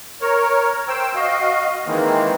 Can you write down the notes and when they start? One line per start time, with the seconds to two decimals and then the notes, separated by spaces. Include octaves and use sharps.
0.21 A#4 C#5
0.88 C5 G5 E6
1.15 F#4 D#5 F5
1.86 D#3 E3 G#3 A#3 C4